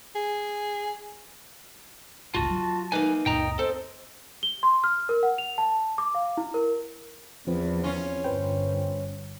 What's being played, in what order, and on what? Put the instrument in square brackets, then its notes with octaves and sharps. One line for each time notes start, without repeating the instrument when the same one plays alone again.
[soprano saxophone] G#4
[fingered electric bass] G1 C#2 A2 [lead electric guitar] F4 F#4 [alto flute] A5
[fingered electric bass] F#3
[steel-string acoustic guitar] A#3 D#4 [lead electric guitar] B4 G#5
[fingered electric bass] C#2 F#2 A#2 [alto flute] D#5 [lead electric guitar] G5 A#5
[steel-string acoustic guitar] C4 [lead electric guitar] A4
[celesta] G7
C6
F6
A#4
F#5
F7
A5
D6
F5
E4
A#4
[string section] E2 [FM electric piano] F3 C4 B4
[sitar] C#4 F4
[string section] G1 [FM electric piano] B4 C5 G5